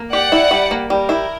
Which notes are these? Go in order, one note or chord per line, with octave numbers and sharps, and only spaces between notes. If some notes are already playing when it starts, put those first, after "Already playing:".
Already playing: A#3
G4 D5 F#5
E4
G3
A#3
G3 A#4
E4